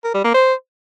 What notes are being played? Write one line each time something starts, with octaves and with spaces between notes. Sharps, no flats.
A#4
G3
A#3
C5